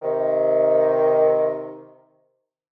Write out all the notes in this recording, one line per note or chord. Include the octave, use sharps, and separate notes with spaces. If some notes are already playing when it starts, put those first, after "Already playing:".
C3 D#3